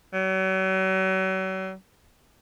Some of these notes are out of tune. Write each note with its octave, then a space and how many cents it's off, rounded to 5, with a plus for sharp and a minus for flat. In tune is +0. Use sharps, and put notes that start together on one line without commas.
F#3 +40